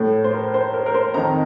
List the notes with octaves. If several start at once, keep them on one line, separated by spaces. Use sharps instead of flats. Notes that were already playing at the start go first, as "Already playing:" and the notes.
Already playing: A2
C5
A#4
C5
A#4
A#4
C5
F2 D#3 A#5